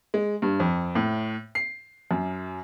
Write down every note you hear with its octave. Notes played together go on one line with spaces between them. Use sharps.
G#3
G2
F2
A2
C7
F#2